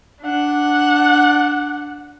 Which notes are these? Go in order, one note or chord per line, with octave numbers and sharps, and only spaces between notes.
D4 F#5